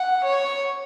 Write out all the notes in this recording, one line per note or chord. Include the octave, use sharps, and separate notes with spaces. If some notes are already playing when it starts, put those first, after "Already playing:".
Already playing: F#5
C#5